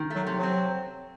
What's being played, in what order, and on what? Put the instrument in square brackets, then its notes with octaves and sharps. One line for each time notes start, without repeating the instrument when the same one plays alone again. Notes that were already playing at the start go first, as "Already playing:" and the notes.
Already playing: [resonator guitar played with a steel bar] D#3
A3
[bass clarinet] F#3
[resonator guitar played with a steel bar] C3
[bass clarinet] F#3
[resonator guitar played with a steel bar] C4